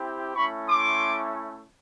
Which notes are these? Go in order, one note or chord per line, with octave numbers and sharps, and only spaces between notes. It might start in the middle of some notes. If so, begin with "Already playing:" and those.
Already playing: C4 E4 G4
A3 C#4 E4 B5 C#6
C6 D6